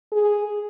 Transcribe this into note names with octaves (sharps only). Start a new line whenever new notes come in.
G#4